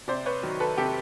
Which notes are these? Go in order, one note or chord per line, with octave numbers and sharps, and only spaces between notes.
C3 C5 D5
B4 C#5
D#3 F#3
A4 B4
C3 G4 A4